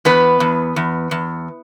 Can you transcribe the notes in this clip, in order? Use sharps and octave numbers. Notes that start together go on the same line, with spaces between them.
E2 B3 B4
E2
E2
E2